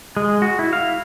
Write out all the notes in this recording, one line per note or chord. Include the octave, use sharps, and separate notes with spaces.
G#3
F#4
E4
F5